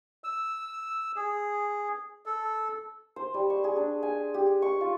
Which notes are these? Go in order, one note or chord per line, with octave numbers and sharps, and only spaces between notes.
E6
G#4
A4
C5
G3
C#6
G#4
D4
G#5
G4
C#6
F4